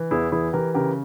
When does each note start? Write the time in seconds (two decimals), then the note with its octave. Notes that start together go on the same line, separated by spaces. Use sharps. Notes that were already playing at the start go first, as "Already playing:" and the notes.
Already playing: E3
0.11 E2 E4 G#4
0.32 E3 E4 G#4
0.53 E3 G4 A#4
0.74 C#3 G4 A#4